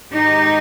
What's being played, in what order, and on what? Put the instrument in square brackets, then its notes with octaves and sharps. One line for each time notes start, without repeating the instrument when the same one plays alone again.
[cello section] G#2 D#3 G#3 D#4 G4